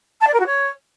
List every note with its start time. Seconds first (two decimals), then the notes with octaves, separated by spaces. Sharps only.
0.20 A5
0.27 D5
0.33 A#4
0.39 F#4
0.46 C#5